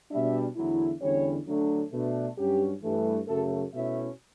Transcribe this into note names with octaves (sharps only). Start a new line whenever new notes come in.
B2 G3 D4 E5
E2 D3 F#3 A3 E4
E2 D3 G3 C#4 E4 C#5
D3 F#3 A3 D4
B2 A3 D4 B4
G2 F#3 C#4 G4
G2 E3 A3
F#2 C#3 F#3 A3 A4
B2 A3 C#4 E4 E5